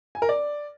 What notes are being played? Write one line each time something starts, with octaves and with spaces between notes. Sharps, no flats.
G#5
A#4
D5